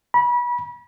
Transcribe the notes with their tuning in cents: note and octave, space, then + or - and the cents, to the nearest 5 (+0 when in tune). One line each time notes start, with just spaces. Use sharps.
B5 -30